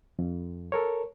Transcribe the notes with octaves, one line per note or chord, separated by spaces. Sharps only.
F2
A4 A#4 C#5